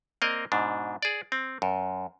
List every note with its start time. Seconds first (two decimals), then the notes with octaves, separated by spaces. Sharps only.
0.22 A#3 C4 A#4 D5 D#5
0.52 G#2 B2 D4
1.02 G#4 D5
1.32 C4
1.62 F#2